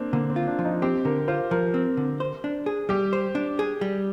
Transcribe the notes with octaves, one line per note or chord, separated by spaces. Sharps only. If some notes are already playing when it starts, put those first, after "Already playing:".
Already playing: A#3 C4 D4
D3 A#3
C4
F4
D4
F3
D#4
C4 G4
D3 A#4
F4 C5
F3 A#4
C4
D3
C5
D4
G#4
G3 G4
C5
D4
G#4
G3